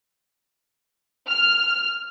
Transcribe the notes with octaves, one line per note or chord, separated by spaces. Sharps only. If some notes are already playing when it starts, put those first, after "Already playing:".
F6